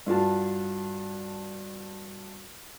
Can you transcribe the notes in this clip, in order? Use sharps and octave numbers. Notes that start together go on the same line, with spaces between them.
G2 F4 F#4 A5